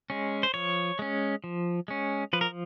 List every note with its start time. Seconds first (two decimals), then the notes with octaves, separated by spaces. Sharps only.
0.10 G#3 C#4
0.43 C5
0.54 F3 C#5
0.99 G#3 C#4
1.44 F3
1.88 G#3 C#4
2.33 F3 B4
2.41 A#4